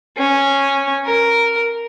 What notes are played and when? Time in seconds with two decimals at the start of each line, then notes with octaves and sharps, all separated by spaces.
0.17 C#4
1.06 A#4